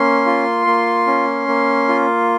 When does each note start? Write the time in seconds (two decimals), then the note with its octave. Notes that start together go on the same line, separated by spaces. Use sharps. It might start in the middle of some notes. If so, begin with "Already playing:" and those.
Already playing: A#3 C#4 C6
0.26 F4
0.67 A#3
1.07 C#4
1.48 A#3
1.88 F4